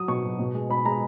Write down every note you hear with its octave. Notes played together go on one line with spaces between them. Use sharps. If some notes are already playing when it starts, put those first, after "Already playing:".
Already playing: F#3 D#6
B2 C#6
F#3
B2
G#3
B2 B5
G#3 A#5